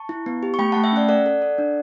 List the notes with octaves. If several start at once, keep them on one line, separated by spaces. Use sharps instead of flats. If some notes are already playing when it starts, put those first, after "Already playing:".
Already playing: A5 C#6
E4
B3
G4
C#6
A3 G5 B5
A3 F#5 A5
E5 G5
C#4 D5 F#5
A4 D5 F#5
A4
A4
D4